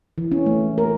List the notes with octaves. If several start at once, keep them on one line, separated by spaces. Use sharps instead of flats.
E3
C#4
A3
A#4